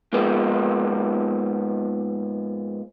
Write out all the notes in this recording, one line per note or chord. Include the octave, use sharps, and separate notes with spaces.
G#2 F3 G#3 A#3 B3